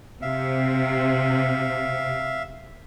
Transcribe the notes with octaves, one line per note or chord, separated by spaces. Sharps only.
C3 E5 F5